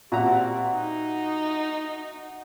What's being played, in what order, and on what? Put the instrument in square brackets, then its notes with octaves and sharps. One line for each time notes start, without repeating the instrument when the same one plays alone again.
[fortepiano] A#2 A#5 [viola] G3 C4 [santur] F#4 E5 F#5
[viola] D#4